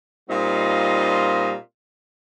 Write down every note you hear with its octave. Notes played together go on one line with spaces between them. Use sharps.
A#2 G3 C4 D#4 F4 D#5